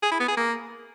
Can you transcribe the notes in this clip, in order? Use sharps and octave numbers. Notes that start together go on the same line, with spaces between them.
G#4
E4
B3
G#4
A#3